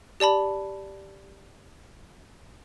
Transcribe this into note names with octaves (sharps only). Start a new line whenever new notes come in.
G4 D5 A5 B5